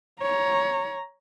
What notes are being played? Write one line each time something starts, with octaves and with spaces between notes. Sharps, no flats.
C#5 A#5